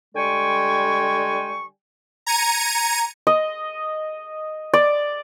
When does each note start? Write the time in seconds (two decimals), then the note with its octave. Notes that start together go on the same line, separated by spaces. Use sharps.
0.15 D3 G3 G#3 G5 G#5 C#6
2.26 A#5 G#6 C#7 D#7
3.27 D#5
4.74 D5